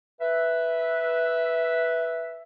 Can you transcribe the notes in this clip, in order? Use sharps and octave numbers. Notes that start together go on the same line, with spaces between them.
B4 E5